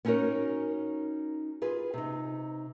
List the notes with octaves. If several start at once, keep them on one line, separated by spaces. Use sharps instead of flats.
B3 C#4 D#4 F#4 A#4 C#5
F4 G#4 B4
C3 D#4